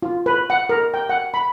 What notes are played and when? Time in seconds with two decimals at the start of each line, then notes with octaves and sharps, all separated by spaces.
0.02 F4
0.26 B4
0.50 F#5
0.69 A#4
0.94 G5
1.09 F#5
1.34 B5